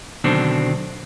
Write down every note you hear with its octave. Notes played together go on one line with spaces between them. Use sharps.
B2 D3 D#3 F#3 C4 D4